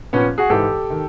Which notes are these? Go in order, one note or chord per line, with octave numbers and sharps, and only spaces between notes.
A#2 F3 B3 C#4
F#4 G#4
G#2 E3 G4 A4
D#3